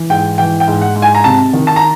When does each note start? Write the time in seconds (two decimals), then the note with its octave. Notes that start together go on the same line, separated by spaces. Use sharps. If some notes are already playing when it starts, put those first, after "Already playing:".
Already playing: E3
0.10 G#2 G5
0.38 E3 G5
0.60 G5
0.68 G#2
0.81 F#5
0.96 G#2
1.02 G#5
1.15 A#5
1.24 C3 A5
1.53 D#3
1.67 A5
1.76 A#5